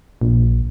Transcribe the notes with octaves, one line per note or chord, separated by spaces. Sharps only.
A#1